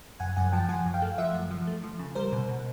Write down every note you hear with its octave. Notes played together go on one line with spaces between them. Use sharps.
F#2 F#5 G#5
F#2 F#5 G#5
F3 G5 A5
F3 F#5 G#5
F#2
F5 G5
A3
F3 E5 F#5
F#2
F3
A3
F3
C#3
G3 A#4 C5
B2
B2